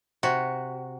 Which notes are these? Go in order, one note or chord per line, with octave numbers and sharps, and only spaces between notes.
C3 F#4